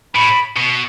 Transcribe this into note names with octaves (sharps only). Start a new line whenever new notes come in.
A2 B5
B2